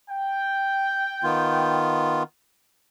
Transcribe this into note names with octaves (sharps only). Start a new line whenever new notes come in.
G5
D#3 B3 F4